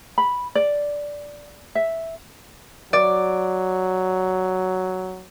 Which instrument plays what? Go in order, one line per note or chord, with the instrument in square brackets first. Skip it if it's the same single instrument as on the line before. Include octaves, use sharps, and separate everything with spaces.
[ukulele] B5
D5
E5
[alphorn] F#3 [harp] D5